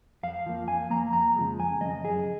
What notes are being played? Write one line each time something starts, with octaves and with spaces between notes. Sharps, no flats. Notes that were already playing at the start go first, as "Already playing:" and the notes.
F2 F5
F3 A#3
F2 G#5
F3 A#3 A#5
F2 A#5
C#3 F3 G#3
F2 G#5
C#3 F3 G#3 D#5
F#2 G#4